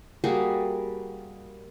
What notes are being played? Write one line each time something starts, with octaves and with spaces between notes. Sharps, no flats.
G3 A#3 F#4 G#4